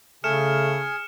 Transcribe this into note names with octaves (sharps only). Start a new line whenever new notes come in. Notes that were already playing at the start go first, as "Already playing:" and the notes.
C#3 A3 G#4 F6 C#7 E7